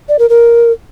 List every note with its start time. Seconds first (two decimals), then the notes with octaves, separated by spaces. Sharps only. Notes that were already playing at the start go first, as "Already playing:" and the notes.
0.09 D5
0.19 A#4
0.29 A#4